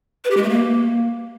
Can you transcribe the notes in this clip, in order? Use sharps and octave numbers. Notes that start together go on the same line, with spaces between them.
B4
G4
G#3
A3
A#3